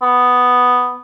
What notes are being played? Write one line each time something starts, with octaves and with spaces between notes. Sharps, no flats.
B3